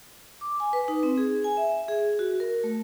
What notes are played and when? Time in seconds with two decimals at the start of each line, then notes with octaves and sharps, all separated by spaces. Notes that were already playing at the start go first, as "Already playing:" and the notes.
0.41 D6
0.60 G#5
0.73 B4
0.88 D#4
1.03 C4
1.18 G#4
1.44 G#5
1.57 E5
1.88 G#4
2.19 F#4
2.40 A#4
2.64 A3